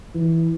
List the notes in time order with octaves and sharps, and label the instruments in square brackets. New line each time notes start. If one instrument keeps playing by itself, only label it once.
[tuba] E3